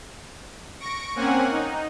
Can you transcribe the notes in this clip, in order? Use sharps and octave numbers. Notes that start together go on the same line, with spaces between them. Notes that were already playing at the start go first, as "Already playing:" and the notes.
C#6 A#6 D7
A#3 C4 C#4 F#5 G#5
D#4